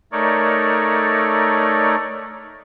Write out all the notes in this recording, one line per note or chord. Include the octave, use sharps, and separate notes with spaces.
A3 D#4 A4 A#4 C#5 D5